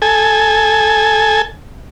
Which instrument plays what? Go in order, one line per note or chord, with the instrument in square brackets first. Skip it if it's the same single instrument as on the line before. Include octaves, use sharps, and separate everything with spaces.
[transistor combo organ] A4 G#5